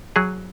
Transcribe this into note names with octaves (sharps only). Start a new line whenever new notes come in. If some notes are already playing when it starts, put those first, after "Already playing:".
F#3 G#4